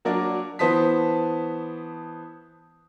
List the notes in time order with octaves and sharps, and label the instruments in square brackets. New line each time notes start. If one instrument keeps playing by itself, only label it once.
[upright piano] F#3 A#3 D4 A#4 D5
E3 B3 C5 A5 D#6 B6